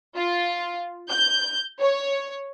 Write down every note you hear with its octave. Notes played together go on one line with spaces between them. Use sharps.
F4
G6
C#5